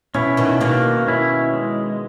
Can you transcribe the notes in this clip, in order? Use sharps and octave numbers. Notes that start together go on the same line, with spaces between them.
B2 C#4 E4
B2 D#3
B2 D#3 A#3
C#4 E4
G#3